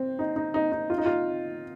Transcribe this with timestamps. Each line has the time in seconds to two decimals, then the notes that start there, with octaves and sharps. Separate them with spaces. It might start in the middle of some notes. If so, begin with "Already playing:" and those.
Already playing: C4
0.19 D#4
0.36 D#4
0.54 D#4
0.72 D#4
0.90 F4
0.98 D#4
1.06 F4